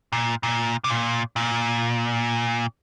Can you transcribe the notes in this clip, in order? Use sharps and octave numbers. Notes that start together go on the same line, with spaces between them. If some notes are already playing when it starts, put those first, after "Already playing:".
A#2
A#2
C3
A#2
A#2